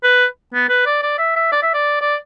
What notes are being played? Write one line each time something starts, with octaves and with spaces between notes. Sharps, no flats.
B4
B3
B4
D5
D5
E5
E5
D5
E5
D5
D5